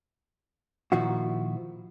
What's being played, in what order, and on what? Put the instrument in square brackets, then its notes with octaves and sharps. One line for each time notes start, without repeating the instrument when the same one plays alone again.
[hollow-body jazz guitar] A#2 D#3 F3 E4 F#4